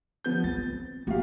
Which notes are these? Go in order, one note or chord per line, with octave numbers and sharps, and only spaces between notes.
F3 B3 G6
C4 A6
A#3 B3 F#4 G4 F5